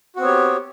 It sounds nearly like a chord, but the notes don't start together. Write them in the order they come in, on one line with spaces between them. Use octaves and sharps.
F#4 C4 B3 C#5 G4